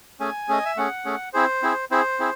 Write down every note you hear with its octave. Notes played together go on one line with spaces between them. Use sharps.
A3 C#4 G#4 G#5
A3 C#4 G#4 D#5
E5
A3 C#4 G#4 F#5
A3 C#4 G#4
C4 E4 G#4 C5
C4 E4 G#4
C4 E4 G#4 C5
C4 E4 G#4